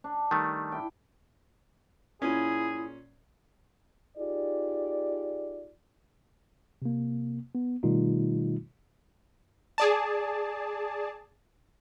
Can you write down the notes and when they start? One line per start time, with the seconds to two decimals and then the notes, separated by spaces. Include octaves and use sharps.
0.04 D4
0.31 D#3 G3 A3
0.72 E4 G5
2.22 A#2 C#4 E4 G#4
4.18 D#4 F4 G4 G#4 D5
6.82 C3 A#3
7.55 B3
7.83 B2 D#3 G3 A3 D#4 F4
9.78 G#4 D5 A5